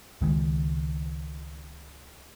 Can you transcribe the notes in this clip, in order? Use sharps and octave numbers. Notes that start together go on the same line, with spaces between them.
C#2 D#3 G#3